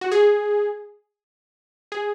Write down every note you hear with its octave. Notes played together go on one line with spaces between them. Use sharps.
F#4
G#4
G#4